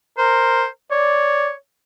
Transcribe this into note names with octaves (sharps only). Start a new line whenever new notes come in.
A#4 C5
C#5 D5